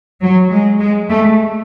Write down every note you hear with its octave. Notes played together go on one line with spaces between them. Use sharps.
F#3
G#3
G#3
A3